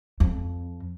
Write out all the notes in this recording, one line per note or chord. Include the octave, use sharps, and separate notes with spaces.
F2